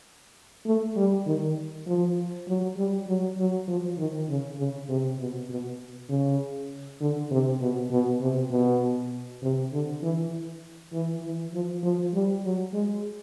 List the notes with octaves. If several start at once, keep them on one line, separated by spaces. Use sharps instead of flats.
A3
G3
D#3
F3
F#3
G3
F#3
F#3
F3
D#3
C#3
C#3
C3
B2
B2
C#3
D3
C3
B2
B2
C3
B2
C3
D3
E3
E3
E3
F3
F3
G3
F#3
G#3